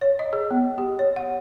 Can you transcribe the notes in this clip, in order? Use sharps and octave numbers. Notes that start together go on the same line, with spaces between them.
C#5
D#5
G#4
B3
G4
C#5
F#5